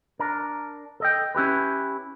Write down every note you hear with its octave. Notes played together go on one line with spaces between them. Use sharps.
D4 A#4
A4 D#5 G5
C#4 E4 G4 B4